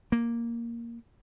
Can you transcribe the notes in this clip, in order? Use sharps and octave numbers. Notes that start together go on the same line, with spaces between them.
A#3